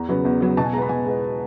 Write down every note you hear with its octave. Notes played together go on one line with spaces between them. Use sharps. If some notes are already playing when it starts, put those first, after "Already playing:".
Already playing: E2 A#5
C#3 F#3 B3
E2
C#3 F#3 B3
B2 A5
G#5
G#3 B3 A#5 B5
B2 G#5
G#3 B3